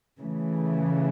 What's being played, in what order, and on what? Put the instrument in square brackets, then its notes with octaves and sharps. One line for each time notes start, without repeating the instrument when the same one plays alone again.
[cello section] C#3 E3 A3